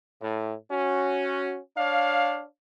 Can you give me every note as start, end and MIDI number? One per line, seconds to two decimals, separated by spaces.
0.22 0.54 45
0.71 1.59 61
0.71 1.59 66
1.78 2.44 62
1.78 2.44 73
1.78 2.44 77